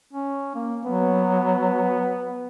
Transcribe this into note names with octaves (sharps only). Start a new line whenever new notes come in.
C#4
A#3
F#3 B3